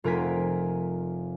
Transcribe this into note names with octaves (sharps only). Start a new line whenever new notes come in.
F1 F4 A#4 G5 G#5 B6